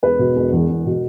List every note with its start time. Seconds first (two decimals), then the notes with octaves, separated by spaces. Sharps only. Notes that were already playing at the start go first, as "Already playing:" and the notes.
0.03 E1 B4
0.19 B2
0.36 E1
0.52 E2
0.69 E1
0.86 B2